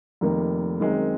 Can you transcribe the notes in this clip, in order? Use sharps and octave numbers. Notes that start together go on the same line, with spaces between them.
F1 F2 D#3 A#3
F#2 D#3 G#3 C4